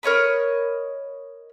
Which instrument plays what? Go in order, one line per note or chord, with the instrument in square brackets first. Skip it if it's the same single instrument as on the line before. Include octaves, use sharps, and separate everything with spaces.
[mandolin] A#4 C#5 D#5 B5